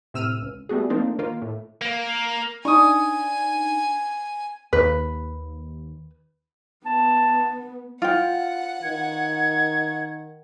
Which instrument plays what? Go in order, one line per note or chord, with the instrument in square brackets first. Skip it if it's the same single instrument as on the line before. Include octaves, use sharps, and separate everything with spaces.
[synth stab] A2 C3 E6 F6 D#7
C#2
G3 A3 B3 F#4 G#4
F3 A3 A#3 C4 D4 D#4
D#3 A#3 F4
A2
[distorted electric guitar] A#3
[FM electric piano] D4 D#4 [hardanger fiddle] G#5 [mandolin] C#6 D#6
[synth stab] D#2 [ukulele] B4
[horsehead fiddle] B3 [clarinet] A5
[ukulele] F4 G5 [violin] F#5
[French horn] D#3 [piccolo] G#6